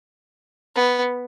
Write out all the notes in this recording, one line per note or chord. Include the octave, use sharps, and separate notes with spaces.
B3